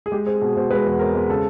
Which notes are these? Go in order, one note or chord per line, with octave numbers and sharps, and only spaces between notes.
G#4
G#3 G4
C4 G#4
B2 G#4
B2 C5
G#3 B4
E2
C4 A#4
G#3
C#3 A4